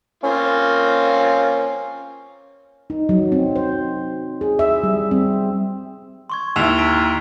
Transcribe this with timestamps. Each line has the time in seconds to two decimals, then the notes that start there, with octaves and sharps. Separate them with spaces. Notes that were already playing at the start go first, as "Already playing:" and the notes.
0.23 A#3 C4 C#4 F4
2.90 D#4
3.09 F#3
3.32 C4
3.56 C5
4.41 G#4
4.59 E5
4.83 G3
5.11 C4
6.30 C6 C#6 G#6
6.56 D#2 E4 E6 E7 F7
6.78 A#5 B6 D7